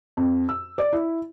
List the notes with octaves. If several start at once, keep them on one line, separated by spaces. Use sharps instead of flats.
F2
E6
D5
E4